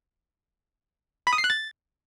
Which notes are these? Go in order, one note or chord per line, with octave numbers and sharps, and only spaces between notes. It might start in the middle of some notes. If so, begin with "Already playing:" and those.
B5
D#6
C7
F#6
A6